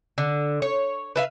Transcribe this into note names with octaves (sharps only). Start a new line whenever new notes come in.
D3
C#5
B4 E5 F5